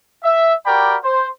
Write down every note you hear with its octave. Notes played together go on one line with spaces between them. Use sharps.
E5
F#4 G4 A#4 D5 G5 B5
C5